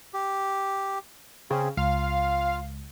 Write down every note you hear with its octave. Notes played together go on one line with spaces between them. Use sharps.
G4
C#3 C4 G#4
C#2 F4 F5